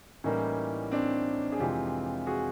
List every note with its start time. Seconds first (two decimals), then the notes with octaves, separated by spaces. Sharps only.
0.24 A2 E3 G3 A#3 C#4 D#4
0.92 C4 D4
1.52 G#4
1.59 F2 C3 E3 G#3 F4 G4
2.27 F#4 G#4